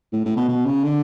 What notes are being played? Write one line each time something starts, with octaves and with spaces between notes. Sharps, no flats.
A2
A2
B2
B2
C#3
D3